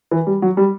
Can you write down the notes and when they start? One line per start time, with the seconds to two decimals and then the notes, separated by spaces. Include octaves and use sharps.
0.11 E3
0.27 G3
0.42 F#3
0.57 G3